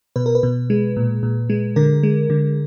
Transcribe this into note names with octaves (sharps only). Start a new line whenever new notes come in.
B2 B4
A#4
B4
B2
G#3
A#2
A#2
G#3
D3 A#4
G#3
D3